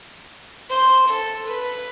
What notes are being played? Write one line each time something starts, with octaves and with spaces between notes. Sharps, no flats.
C5
A4
B4